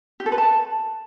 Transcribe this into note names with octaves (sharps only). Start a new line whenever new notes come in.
G4
A4
B4
A5